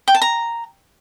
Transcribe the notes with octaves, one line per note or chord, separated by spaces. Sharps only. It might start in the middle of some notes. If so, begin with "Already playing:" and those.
G5
A5
A#5